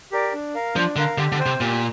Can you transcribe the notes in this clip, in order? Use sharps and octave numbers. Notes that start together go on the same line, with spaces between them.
G4 A#4 D5
D4
A#4 F5
F3 D4
D3 A#4 F5
D3 G4
D3
C5 G5
C3
A#2 G4